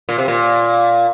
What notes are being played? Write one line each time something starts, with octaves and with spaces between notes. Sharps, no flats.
A#2
C3
A#2